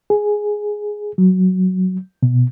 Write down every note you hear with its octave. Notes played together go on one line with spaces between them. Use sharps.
G#4
F#3
B2